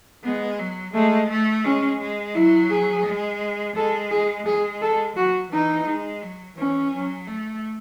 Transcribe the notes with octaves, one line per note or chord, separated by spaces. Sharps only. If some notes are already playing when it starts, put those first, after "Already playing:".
G#3 B3
F#3
G#3 A3
A3
G#3 C#4
G#3
F#3 E4
G#4
G#3
G#3 A4
G#4
G#3 G#4
A4
F#3 F#4
E3 D#4
G#3
F#3
E3 C#4
F#3
A3